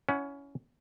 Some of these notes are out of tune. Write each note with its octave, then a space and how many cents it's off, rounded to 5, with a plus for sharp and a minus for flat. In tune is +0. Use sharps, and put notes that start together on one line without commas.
C#4 +20 E4 +0 F#5 +0